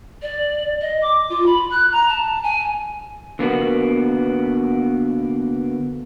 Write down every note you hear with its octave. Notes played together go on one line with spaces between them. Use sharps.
D5
D#5
D6
F4
B5
F#6
A#5
A5
G#5
D3 A#3 B3 F#4